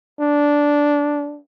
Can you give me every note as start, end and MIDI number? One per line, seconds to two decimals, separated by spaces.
0.20 1.39 62